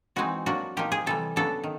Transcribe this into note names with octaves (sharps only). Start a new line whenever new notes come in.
E3 G#3 C4 D#4 F#4
F#3 A#3 D4 F#4
A#2 F3 A#3 D#4 G4
G#4
C3 E3 G3 A4
C#3 F#3 B3 D4 A4
D#3